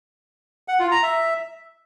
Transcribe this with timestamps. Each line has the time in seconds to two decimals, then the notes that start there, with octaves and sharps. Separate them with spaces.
0.68 F#5
0.80 F4
0.91 A#5
1.03 E5